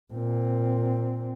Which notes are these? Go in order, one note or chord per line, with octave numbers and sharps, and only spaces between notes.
A#2 C4